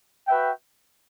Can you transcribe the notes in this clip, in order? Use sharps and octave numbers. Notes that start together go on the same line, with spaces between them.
F#4 B4 E5 G5